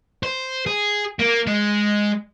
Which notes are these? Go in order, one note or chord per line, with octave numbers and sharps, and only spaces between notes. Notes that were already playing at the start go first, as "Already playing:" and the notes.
C5
G#4
A#3
G#3